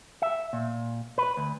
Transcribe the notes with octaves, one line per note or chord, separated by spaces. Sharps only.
E5
A#2
B4
D2